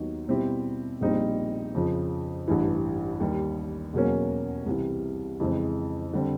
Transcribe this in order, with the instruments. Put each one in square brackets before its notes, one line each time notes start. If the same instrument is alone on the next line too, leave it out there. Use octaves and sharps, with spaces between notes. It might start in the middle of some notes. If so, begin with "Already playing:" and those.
Already playing: [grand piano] D#2 D#3 F#3 B3 D#4
B2 G3 C4 E4 G4
A#1 A#2 G3 C4 D#4
F2 C#3 F3
A1 G2 E3
D#2 D#3 G3
E2 B2 F#3 A#3 C#4
C2 C3 E3
F2 C#3 E3 G#3 C4
D3 G3 C4